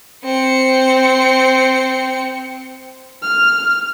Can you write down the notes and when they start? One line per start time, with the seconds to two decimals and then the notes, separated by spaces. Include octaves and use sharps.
0.24 C4 C#7
3.22 F6